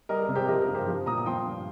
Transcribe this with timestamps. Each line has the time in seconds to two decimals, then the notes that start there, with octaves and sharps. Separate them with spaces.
0.09 G3 A#4 D#5
0.22 A#4
0.28 C3
0.35 G4 C5
0.48 F3 A#4 D#5
0.62 A#4
0.68 G2
0.75 G4 C5
0.88 F3
1.06 A#2 A#5 D#6
1.18 D#6
1.26 F3 G5 C6
1.46 G2